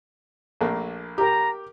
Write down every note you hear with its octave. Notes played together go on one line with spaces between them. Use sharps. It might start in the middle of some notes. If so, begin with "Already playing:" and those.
A#1 A3 A#3
G4 A#4 A#5